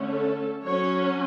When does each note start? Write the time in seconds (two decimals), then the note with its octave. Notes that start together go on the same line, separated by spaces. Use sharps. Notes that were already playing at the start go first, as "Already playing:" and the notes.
Already playing: D3 A3 C#4
0.13 A4
0.65 F#3 C#4 C#5